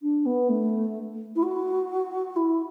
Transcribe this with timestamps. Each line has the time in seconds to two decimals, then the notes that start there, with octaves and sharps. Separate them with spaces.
0.02 D4
0.26 B3
0.49 A3
1.36 E4
1.43 F#4
2.36 E4